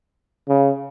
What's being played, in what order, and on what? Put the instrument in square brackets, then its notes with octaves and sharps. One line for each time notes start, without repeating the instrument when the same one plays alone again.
[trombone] C#3